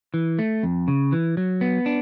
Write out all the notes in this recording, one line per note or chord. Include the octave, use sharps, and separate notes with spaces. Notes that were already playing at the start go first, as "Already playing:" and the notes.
E3
A3
F2
C#3
E3
F#3
B3
D4